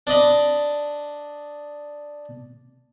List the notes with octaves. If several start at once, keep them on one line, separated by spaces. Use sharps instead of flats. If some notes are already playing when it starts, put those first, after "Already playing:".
D4 D5 D#5 B5